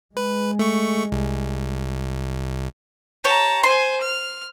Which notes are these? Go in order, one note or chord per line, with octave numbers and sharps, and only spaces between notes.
G#3 B4
A3 C#6
C2
G4 C#5 A5 A#5
C5 G#5 C6
F6